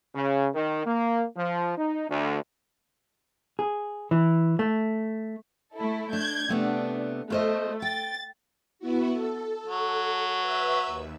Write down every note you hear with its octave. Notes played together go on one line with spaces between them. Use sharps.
C#3
D#3
A#3
F3
D#4
D2
G#4
E3
A3
A3 E4 A4
D4 G6 G#6
C3 A3 B3 D4
A3 F4 C5 D#5
G5 A6
B3 E4 F#4
A4
F#3
B4 E5 E6
D#2